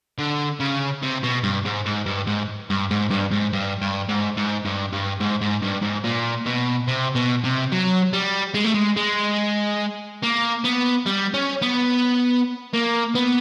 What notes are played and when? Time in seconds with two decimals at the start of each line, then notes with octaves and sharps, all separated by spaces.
0.19 D3
0.60 C#3
1.02 C3
1.23 B2
1.43 G2
1.65 G#2
1.85 G#2
2.06 G2
2.27 G#2
2.70 G2
2.91 G#2
3.10 G2
3.31 G#2
3.53 G2
3.81 G2
4.09 G#2
4.37 G#2
4.65 G2
4.92 G2
5.20 G#2
5.41 G#2
5.62 G2
5.82 G#2
6.04 A#2
6.46 B2
6.87 C3
7.15 B2
7.44 C3
7.72 F#3
8.13 G3
8.54 G#3
8.64 A3
8.74 G#3
8.96 G#3
10.23 A#3
10.64 B3
11.06 G3
11.34 C#4
11.62 B3
12.74 A#3
13.15 B3